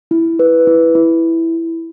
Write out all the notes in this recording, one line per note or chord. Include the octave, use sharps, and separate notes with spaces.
E4
B4
E4
E4